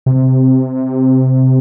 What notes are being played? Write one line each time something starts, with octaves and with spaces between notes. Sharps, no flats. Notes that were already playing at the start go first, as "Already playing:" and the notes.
C3